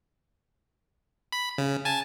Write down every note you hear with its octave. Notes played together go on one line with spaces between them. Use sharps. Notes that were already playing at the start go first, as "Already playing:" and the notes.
B5
C#3
G#5 A5